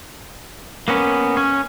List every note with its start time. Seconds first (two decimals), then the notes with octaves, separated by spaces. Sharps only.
0.88 A#3 B3 C#4
1.37 C#4